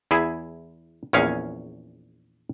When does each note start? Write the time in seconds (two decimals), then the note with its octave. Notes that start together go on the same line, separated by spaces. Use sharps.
0.11 E2 E4 G#4
1.13 A#1 E2 C#4 G#4 C#5 F5